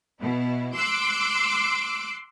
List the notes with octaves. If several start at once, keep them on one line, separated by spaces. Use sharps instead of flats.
B2 E4
C6 D6 E6 F#6